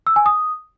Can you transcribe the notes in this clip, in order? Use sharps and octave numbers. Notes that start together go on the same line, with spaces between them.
E6
G#5
D#6